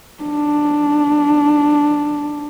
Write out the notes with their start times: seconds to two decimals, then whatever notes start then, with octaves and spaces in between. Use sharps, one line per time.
0.23 D4